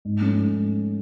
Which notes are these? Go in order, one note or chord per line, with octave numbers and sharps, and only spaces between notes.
G#2
F3 A3 C#4
G#2